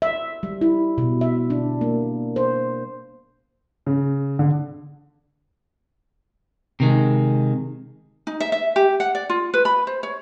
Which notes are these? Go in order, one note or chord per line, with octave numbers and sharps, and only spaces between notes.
E5
G3
E4
B2
E5
D4
A#3
C5
C#3
D3
C3 D#3 G#3
D#4
E5
E5
G4
F#5
D5
F4
B4
B5
C5
C#5